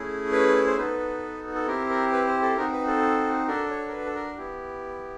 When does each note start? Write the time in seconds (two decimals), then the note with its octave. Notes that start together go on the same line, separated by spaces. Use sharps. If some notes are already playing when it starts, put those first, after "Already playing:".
Already playing: A3 C#4 E4 G#4
0.32 B4
0.66 C5
0.77 B3 D#4 F#4 A4 B4
1.55 A4
1.67 C4 E4 G4 A#4
1.90 A#4
2.12 B4
2.27 C5
2.42 A4
2.57 C4 D#4 F#4 A#4
2.72 B4
2.87 A4
3.47 D4 F#4 A4 A#4
3.70 C#5
3.88 A#4
3.92 B4
4.06 A4
4.15 A#4
4.37 B3 E4 G4